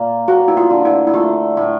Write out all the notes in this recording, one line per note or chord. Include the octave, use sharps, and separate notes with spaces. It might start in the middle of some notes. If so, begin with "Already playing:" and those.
Already playing: A#2 A#3
A#3 F#4
E4
F4
D3
E4
E4
A3 F4
A2 E4